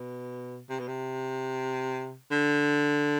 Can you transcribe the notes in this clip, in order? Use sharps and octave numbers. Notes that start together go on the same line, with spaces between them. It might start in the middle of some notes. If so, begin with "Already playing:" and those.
Already playing: B2
C3
B2
C3
D3